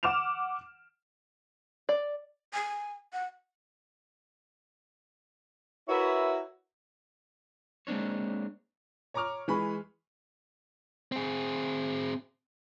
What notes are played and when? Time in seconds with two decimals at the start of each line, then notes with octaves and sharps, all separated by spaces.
0.03 F#5 D6 F6 E7 F7
1.89 D5
2.53 G#5
3.13 F#5
5.89 E4 F#4 A#4 B4 C#5 E5
7.87 G#3 A#3 C4 D4 C#5
9.14 C#5 A#5 C#6 D6 F6
9.48 E3 G#3 B4 B5 C#6
11.12 C4 G#4